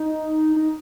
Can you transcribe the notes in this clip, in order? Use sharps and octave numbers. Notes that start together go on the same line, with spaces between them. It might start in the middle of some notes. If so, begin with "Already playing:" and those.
Already playing: D#4
D#4